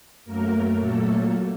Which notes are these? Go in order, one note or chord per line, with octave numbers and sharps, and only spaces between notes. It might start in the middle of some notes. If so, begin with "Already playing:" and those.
F#2 F#3 A3 A#3 A#4
A#2 F#3 A3 A#3 A4